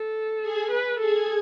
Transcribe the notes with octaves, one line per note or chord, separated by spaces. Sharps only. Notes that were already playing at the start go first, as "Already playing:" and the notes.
Already playing: A4
G#4 G#5
B4
G#4 A4 G#5